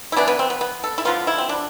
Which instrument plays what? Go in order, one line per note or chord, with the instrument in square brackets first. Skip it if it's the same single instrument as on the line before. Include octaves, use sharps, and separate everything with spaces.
[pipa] E4
E3 B3 D4
B3
C4
B3
B3
A4
E4
D3 F3 B3 F4
E4
C4
D4